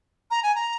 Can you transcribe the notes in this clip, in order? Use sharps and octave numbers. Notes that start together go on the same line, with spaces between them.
A#5
G#5
A#5